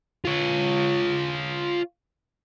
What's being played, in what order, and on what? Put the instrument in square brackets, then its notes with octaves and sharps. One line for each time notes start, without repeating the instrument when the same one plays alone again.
[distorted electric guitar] F4 C#5